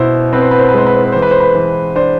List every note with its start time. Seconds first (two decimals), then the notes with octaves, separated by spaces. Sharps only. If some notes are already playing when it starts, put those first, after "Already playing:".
Already playing: B2 E4 C5
0.33 C4 B4
0.42 C5
0.51 B4
0.59 C5
0.69 B4
0.74 G#3 C5
0.86 B4
0.95 C5
1.04 B4
1.12 E3 C5
1.22 B4
1.31 C5
1.40 B4
1.55 E3
1.96 D4 C5